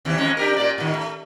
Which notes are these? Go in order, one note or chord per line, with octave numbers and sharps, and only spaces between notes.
D#2 C3 E3
F2 G#3 C#4
D4 G4 A#4
A#2 A#3 D5
A2 D#3
A3